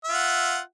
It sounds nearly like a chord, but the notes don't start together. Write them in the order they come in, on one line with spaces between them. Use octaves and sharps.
E5 F4 F#5